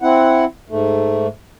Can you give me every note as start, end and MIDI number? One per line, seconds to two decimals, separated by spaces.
0.01 0.45 60
0.01 0.45 64
0.01 0.45 78
0.70 1.27 44
0.70 1.27 57